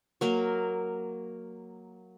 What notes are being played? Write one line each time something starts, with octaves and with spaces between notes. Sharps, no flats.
F#3 A#3 A#4